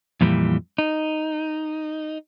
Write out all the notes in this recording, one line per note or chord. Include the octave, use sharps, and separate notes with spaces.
F2 A#2 E3 G3
D#4